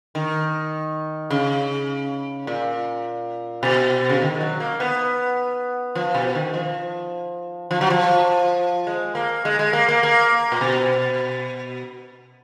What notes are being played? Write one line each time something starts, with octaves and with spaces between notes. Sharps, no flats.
D#3
C#3
A#2
B2
C#3
D#3
G#3
F#3
A#3
B3
F3
B2
D#3
F3
F3
F#3
F3
G#3
A#3
G#3
G#3
A#3
A#3
A#3
A#2
B2